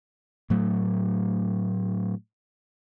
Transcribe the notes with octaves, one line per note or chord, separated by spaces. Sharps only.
A2 F#3 A3